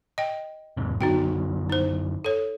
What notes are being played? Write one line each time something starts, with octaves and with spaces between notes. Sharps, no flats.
D#5 G5
E2 G#2 C3
F#2 D3 B3 D#4 F#4 G5
D#4 C5
A4 C#5